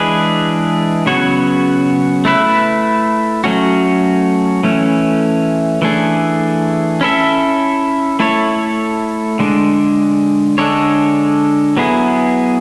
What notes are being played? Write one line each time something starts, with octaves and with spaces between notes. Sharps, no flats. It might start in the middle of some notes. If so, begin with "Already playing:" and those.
Already playing: E3 G#3 D4 G#4 B4
C#3 F#3 B3 F#4 C#5
A3 E4 B4 E5
F#3 A3 C#4 F#4
E3 A3 C#4
E3 A3 D4 G#4
C#4 E4 A4 E5
A3 E4 A4 C#5
D3 G#3 D4
D3 G#3 D4 A4 C#5
F#3 B3 E4 G#4